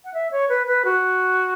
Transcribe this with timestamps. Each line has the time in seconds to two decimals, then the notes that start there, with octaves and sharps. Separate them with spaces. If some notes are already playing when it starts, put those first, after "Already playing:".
0.04 F#5
0.14 E5
0.31 C#5
0.49 B4
0.67 B4
0.85 F#4